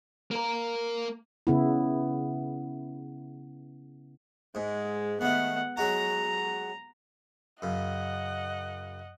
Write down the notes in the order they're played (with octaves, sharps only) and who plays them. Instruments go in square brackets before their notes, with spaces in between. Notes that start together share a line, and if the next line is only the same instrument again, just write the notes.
[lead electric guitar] A#3 A#4
[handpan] C#3 B3 E4
[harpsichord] G#2 [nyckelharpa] G#3
[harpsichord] D#3 A3 [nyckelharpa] B3 F#5
[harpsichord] F#3 G#3 F#4 [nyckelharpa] A#5
[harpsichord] F#2 C#3 [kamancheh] D#5 F#5